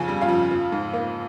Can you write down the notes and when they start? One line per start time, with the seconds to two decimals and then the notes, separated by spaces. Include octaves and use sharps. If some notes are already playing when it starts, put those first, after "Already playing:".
Already playing: F2 C#3 G#4 G#5
0.08 G3
0.21 F4 F5
0.29 F2
0.51 F3
0.72 G#2
0.93 A#3